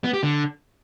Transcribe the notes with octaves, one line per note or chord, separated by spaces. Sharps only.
B3
G4
D3